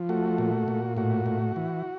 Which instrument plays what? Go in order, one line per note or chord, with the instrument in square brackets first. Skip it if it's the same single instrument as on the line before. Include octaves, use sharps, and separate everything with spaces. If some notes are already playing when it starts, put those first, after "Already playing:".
Already playing: [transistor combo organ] F3
A3 F#4
A#2
A#2
A2 F#4
A2
E3